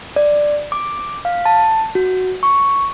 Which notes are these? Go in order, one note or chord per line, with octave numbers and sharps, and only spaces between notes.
D5
D6
F5
A5
F#4
C#6